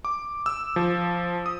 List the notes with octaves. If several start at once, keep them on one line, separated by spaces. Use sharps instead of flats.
D6
E6
F3
D#6